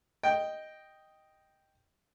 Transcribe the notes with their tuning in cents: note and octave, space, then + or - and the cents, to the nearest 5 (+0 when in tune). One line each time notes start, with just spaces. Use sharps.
D#5 +0 G5 +0